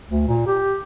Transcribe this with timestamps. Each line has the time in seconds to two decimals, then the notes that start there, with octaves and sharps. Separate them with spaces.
0.11 D2
0.28 A#2
0.47 G4